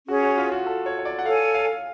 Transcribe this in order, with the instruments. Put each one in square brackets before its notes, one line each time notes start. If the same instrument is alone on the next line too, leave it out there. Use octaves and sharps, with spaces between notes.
[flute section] C#4 G#4 C#5 [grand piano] F#4
[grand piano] F#4
F4
F#4
A4
C#5
C#5
D5
F#5
[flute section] A4 C#5 G#5 [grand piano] F5
[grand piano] F5